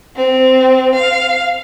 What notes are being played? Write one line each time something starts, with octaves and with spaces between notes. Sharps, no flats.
C4
F5